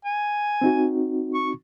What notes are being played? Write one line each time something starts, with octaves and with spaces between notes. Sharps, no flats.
G#5
C4 D#4 F#4
C#6